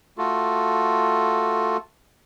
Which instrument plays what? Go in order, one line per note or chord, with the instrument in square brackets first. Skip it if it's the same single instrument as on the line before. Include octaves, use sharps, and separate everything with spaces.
[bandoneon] A3 F4 F#4 A4